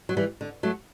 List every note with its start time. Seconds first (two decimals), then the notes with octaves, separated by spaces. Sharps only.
0.09 F#3
0.17 E3 G3
0.41 D3
0.63 F#3 A3